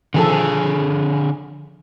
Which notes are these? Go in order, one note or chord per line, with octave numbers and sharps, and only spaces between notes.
D3 D#3 F3 G#4 A4